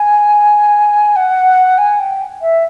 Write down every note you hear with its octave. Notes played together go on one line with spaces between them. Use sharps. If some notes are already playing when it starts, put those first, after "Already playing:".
Already playing: G#5
F#5
G#5
G5
E5